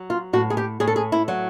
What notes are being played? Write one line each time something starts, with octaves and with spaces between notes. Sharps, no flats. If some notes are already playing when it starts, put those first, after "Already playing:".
Already playing: F#3
F4
A2 F#4
G#4
G4
A2 G#4
A4
G#4
E4
F#3